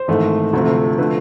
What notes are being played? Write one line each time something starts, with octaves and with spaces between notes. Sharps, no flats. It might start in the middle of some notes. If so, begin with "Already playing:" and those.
Already playing: C5
G#1 G#2 E3 A3
D2 C3 F3 A3
D3 F3 A3 B4